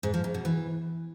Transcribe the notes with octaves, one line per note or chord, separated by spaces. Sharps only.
G#2
F3
G#2
B2
E3